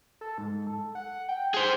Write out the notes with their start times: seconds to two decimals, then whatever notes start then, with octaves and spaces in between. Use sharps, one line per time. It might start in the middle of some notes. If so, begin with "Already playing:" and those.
0.21 A4
0.38 G#2
0.67 A4
0.95 F#5
1.29 G5
1.54 G#4 C5